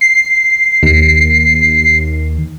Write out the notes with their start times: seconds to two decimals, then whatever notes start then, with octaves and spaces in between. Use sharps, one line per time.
0.01 C7
0.83 D#2